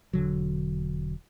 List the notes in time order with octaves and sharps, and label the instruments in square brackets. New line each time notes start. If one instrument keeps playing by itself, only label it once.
[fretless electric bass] E1 D3 F#3